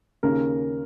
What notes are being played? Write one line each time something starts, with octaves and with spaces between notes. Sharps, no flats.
D#2 C#3 A#4